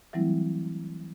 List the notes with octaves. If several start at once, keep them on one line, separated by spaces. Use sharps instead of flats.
E3 F#3 G3 A3 C4 E4